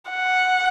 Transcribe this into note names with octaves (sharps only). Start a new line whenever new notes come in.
F#5